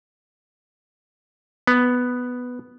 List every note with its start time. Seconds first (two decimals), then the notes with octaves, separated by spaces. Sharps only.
1.67 B3